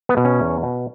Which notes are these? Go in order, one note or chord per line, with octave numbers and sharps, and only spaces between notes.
B3
B2
C#4
E2
B2